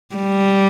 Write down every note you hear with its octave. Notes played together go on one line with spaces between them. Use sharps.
G3